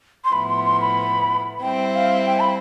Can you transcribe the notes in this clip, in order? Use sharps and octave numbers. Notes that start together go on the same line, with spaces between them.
C6
A2 F3 B3 E4 B5
C6
C6
B5
G3 C4 E4 G5
F5
G5
B5